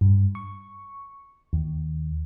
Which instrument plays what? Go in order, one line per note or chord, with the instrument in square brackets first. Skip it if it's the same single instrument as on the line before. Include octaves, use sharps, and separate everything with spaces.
[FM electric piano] G2
C#6
D#2